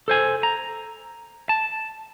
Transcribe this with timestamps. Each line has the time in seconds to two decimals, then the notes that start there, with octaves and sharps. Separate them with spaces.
0.08 A4 C5 G#5
0.43 A#5
1.49 A5